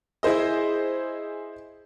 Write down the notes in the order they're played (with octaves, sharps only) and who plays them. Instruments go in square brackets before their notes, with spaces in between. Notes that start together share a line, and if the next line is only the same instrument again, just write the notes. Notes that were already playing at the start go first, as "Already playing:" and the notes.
[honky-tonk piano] E4 G#4 C5 D#5